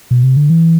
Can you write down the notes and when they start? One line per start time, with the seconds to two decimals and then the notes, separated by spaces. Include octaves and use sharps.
0.11 B2
0.23 C3
0.37 D3
0.50 E3